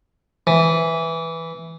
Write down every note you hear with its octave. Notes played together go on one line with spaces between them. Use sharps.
E3